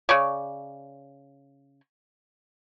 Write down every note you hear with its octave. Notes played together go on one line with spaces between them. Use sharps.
C#3 C#5 D5